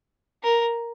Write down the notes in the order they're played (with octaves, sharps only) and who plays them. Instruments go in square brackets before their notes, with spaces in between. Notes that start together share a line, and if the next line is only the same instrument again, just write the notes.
[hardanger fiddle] A#4